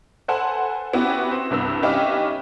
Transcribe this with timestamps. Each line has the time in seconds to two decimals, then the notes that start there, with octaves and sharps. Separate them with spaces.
0.28 A4 B4 C5 F#5 G#5 A5
0.93 B3 C#4 E4 F#4 G4 B4
1.31 C4
1.51 C2 G2 B3 E6
1.82 C#4 D#4 G4 B4 E5 F5